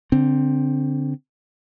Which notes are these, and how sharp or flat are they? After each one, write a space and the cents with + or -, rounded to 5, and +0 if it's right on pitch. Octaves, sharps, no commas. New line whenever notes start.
D3 -20 C4 +0